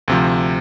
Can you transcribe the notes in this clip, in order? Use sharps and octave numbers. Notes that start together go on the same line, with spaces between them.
D2 C3 F3